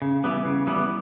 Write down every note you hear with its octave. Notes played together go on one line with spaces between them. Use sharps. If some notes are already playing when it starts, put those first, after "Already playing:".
C#3
E3 G3 B3
C#3
E3 G3 B3